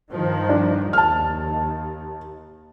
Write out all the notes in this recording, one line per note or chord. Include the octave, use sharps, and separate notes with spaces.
G2 D#3 F3
D4
D#2 A5 F6